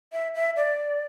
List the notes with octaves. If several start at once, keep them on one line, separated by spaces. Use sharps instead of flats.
E5
E5
D5